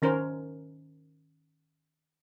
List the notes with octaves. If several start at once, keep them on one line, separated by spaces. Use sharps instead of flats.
D#3 C#4 A#4 C5